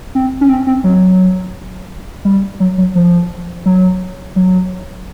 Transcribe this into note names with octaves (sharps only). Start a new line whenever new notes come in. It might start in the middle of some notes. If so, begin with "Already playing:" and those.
C4
C#4
C4
C4
F#3
G3
F#3
F#3
F3
F#3
F#3